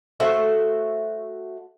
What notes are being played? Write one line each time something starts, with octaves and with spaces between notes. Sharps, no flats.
A3 F#4 C5 E5